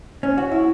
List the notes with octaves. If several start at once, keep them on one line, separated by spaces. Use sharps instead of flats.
C#4
F#4
E4